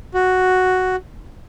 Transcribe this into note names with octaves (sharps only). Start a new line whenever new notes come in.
F#4